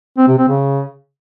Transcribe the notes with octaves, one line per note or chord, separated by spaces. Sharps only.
C4
C3
C4
C#3